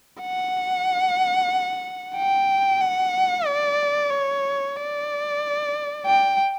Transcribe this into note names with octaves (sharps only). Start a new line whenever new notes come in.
F#5
G5
F#5
D5
C#5
D5
G5